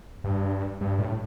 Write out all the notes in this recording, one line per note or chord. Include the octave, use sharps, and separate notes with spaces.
G2
G2
A2